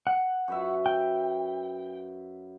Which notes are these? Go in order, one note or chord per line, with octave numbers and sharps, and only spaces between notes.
F#5
F#2 B4 E5
G5